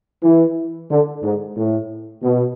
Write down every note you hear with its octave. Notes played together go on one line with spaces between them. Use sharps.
E3
D3
G#2
A2
B2